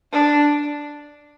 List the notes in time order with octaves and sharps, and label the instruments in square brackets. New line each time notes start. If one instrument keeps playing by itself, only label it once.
[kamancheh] D4